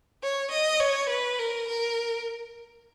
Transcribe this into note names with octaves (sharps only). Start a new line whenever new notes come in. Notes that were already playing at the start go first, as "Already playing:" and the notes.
C#5
D#5
C#5
B4
A#4
A#4